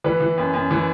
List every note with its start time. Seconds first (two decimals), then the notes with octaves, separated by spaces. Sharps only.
0.04 E3 B4
0.21 E3
0.38 F#2
0.54 F#2
0.71 E3